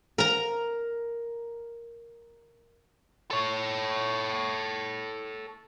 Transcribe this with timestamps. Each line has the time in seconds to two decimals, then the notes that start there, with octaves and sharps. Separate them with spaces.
0.18 A#4 A#5
3.31 A4 C#5